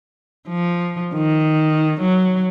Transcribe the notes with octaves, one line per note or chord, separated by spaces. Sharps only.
F3
D#3
F#3